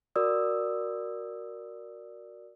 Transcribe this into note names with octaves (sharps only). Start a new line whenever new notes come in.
F#4 A#4 D5 D#6 E6